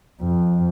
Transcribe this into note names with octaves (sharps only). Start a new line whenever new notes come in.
F2